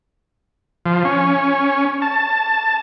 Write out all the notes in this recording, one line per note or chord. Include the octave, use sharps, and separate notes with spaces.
F3
C#4
A5